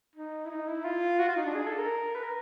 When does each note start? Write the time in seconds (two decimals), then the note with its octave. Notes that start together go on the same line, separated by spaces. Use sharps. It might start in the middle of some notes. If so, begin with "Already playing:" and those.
0.16 D#4
0.46 E4
0.50 D#4
0.68 E4
0.85 F4
1.19 F#4
1.29 F4
1.37 D#4
1.46 D4
1.54 G#4
1.67 A4
1.78 A#4
2.16 B4
2.24 A#4